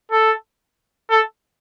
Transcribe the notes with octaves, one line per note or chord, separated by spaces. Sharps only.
A4
A4